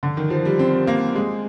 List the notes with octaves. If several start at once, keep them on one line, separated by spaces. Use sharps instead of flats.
D3
D#3
F3
G3
C4
A#3
G#3